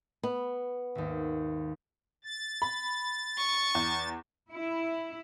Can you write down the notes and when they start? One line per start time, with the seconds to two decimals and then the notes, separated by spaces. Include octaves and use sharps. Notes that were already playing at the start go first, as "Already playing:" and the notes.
0.23 B3
0.95 G#1 D#2
2.25 A6
2.62 B5
3.38 C#6
3.75 E2
4.52 E4